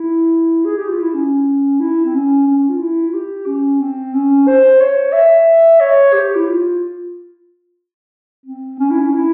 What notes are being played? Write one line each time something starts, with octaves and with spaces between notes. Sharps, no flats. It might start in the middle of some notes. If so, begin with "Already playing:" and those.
Already playing: E4
G#4
G4
F4
E4
C#4
E4
C4
C#4
C#4
F4
E4
F4
G4
C#4
C4
C#4
C5
C#5
E5
C#5
G4
E4
F4
C4
C#4
E4
C#4
E4